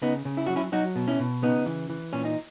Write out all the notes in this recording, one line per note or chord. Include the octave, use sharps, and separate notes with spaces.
C#3 B3 D#4
C#3
E4
F#3 F#4
C#4 E4
F#3 D#4 F#4
B2
C#4 E4
B2
C#3 B3 D#4
E3
E3
A#2 C#4
D#4